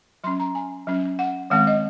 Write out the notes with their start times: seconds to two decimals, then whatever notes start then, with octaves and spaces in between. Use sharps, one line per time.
0.24 F#3 C6
0.27 C#4
0.40 A#5
0.55 G#5
0.87 F#3 C#4
1.19 F#5
1.50 D#3 G#3 C4 F#5
1.67 D#5